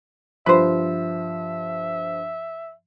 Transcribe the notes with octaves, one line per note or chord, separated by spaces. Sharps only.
G2 F3 B4 C5 E5